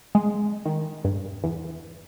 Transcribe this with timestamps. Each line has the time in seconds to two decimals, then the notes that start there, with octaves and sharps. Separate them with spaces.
0.15 G#3
0.65 D#3
1.05 G2
1.44 E2